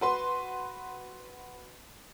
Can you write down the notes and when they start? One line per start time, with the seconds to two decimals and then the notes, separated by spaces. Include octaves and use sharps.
0.01 F#4 B4 C6